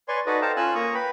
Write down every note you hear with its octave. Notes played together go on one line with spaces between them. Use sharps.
B4 C#5 D5 G#5 C6 C#6
D#4 F#4 A4 B4 D5 D#5
A4 C5 F5 G5 A5 A#5
C#4 F4 G#5 E6 F#6
A#3 A#5 C#6 D#6
B4 G5 B5